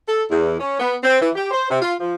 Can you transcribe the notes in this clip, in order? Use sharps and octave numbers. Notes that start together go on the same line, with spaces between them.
A4
E2
C#4
B3
C4
E3
G4
C5
C3
F4
F3